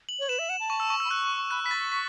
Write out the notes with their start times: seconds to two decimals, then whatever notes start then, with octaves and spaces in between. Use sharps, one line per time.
0.09 F#7
0.20 C#5
0.29 B4 E7
0.39 E5
0.49 F#5 E7
0.60 A5
0.70 C#6
0.80 E6
0.90 C#6
1.00 E6
1.05 B5
1.09 C#6 F#6
1.51 B5 F#6
1.64 B5 B6
1.71 A6
1.78 C#6
1.91 C#6 B6